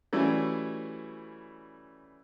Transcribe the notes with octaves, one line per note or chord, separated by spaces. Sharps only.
E3 F#3 G3 A3 C#4 E4